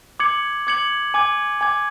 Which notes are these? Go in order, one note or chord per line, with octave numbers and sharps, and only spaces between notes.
D6 G#6 C#7 F#7
D6 G#6 C#7 F#7
G#5 D6 G#6
G#5 D6 G#6